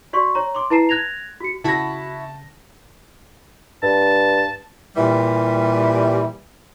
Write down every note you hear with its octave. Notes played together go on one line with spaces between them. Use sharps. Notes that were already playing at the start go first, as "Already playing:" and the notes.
F#4 D5 C6 C#6
C#5 A#5
C6 D6
E4 B4 A5 A#5 C7 E7
F#6 G#6 A#6 F7
F#4 C#7
C#3 E4 F#4 A5 B5 A#6
G2 A5
A#2 E3 G3